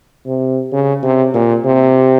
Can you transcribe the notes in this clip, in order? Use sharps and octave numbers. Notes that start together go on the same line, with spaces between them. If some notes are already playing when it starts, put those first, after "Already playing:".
C3
C#3
C3
A#2
C3